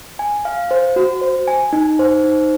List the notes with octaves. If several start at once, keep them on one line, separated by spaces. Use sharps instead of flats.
G#5
F5
C5
F#4
C5
G#5
D#4
C5
D#4